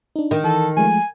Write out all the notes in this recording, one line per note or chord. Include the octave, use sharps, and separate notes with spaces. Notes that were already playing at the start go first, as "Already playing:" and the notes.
D4 D#4
D#3
E3 A4
F3 G#3 A3 G#5